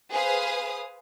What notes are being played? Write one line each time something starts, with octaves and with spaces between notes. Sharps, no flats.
G#4 B4 C5 F5 D#6